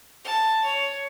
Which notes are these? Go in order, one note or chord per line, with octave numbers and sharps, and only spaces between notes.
A5
C#5